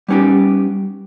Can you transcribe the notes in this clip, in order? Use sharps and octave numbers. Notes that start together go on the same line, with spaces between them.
G3 B3 C#4 D#4 G4